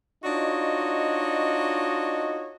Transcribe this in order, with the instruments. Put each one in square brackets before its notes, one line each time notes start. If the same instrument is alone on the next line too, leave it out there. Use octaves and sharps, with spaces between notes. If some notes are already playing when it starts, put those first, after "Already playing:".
[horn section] D4 D#4 F4 F#4 C#5 D#5